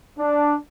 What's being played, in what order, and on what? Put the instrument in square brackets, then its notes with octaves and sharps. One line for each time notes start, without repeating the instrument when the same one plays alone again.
[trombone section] D4